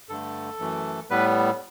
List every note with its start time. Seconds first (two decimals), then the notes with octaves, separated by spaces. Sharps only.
0.09 G2 D3 A3 A4
0.59 F#2 E3 A3
1.10 A2 G3 B3 B4